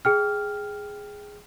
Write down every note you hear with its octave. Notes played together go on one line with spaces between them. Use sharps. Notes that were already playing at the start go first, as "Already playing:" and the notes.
G#4 G5 F6